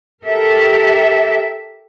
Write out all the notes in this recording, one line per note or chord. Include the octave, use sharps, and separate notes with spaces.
G4 A4 A#4 E5